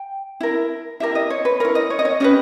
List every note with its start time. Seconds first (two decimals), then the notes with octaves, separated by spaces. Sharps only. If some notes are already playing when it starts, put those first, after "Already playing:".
Already playing: G5
0.40 E4 A#4
1.00 E4 G4 A#4 E5
1.15 D#5
1.30 C#5
1.45 B4
1.60 E4 A#4 C#5
1.75 D#5
1.90 C#5
1.99 D#5
2.05 C#5
2.20 C#4 G4 B4 D#5